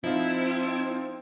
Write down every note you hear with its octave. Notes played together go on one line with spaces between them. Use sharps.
F3 C4 D#4 E4 F5